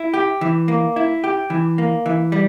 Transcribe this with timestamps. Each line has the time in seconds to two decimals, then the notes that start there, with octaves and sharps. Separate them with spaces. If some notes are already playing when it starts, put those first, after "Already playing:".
Already playing: E4
0.14 G4
0.41 E3
0.68 A#3
0.96 E4
1.24 G4
1.50 E3
1.78 A#3
2.06 E3
2.32 G3